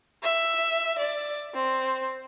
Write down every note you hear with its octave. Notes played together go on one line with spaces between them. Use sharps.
E5
D5
C4